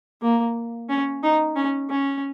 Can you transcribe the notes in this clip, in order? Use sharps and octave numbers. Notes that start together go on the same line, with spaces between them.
A#3
C#4
D#4
C#4
C#4